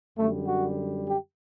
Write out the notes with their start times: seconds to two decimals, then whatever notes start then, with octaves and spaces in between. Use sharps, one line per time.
0.18 F#2 D3 G3 A3
0.48 F#4
1.09 G4